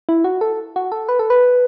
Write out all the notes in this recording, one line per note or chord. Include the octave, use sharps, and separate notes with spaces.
E4
F#4
A4
F#4
A4
B4
A4
B4